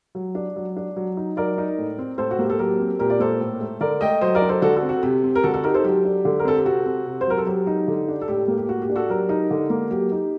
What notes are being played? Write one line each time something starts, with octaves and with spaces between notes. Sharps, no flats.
F#3
D4
F#3
D4
F#3
D#4
F#3 A#4 D5
D#4
A2
C4
A2 A4 C5
F#4
A#3 G4
A4
F#3 G4 A#4
C4
A#2 G4 A#4
D5
A#3 A4 C5
A2
A3
D3 A#4 D5
A3 D#5 G5
F#3 C5 D#5
A#4 D5
D4
A4 C5
D3 F#4 A4
F#4 A4
C4
F#4
C3 G4
C4
A#4
D3 F#4 A4
F#4 A4
D#4 G4 A#4
A4 C5
F#3 G4
D4
D3
A#4
C4 A4
G4
C3 F#4
C4
C3
C5
F#3 A#4
A4
F#3 G4
D#4
D3
D4
A4
A2 G4
A#3
G4
A2 F#4
G4
D4
F#4 A4
F#3 G4 A#4
D#4
D3
A#3
F#3 G4
D#4